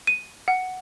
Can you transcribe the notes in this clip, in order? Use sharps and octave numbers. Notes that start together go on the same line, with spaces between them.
D#7
F#5